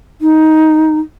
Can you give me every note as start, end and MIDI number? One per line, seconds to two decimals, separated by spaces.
0.21 0.99 63